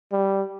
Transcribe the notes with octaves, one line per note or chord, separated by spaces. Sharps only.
G3